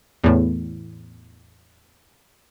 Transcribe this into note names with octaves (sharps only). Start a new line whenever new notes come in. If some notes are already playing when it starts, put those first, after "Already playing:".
E2 A2